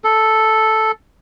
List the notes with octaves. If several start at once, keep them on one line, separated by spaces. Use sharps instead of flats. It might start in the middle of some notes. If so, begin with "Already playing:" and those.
A4